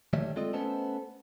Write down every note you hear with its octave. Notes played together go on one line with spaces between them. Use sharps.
D#3 G3 A3 C#5 E5
G#3 C4 F4 A4 D5 D#5
A3 B3 C#4 A4 C5 D#5